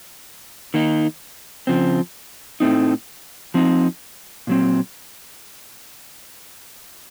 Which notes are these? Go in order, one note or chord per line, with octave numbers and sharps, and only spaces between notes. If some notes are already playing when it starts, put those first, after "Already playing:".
D#3 A#3 D#4
C#3 F3 C4
A2 A3 C4 D#4
F3 C4 D#4
A#2 F#3 C4